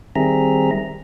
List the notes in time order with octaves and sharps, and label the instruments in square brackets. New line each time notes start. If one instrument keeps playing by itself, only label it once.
[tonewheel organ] D#3 G3 C4 G#4 E5 A#5